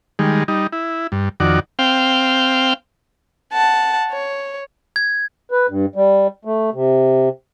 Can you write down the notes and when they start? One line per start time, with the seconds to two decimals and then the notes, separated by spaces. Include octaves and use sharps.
0.19 D#3 G3 G#3
0.48 G3 D#4
0.73 E4
1.12 G2
1.40 F2 D#3 F#4 D5
1.79 C4 F5 G5
3.53 F#5 A5
4.11 C#5
4.96 G#6
5.51 B4
5.69 G2
5.96 G3
6.45 A3
6.73 C3